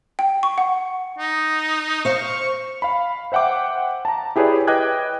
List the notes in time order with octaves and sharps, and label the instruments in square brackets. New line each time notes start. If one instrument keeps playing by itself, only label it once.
[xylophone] G5
C#6
F#5
[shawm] D#4
[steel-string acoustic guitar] C5 F5 [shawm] C#6
[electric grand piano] F5 B5
C5 E5 F#5 G5 D6
A5 A#5
E4 G4 G#4 B4 C#5 D5
B4 D#5 G5 D6 F#6 G#6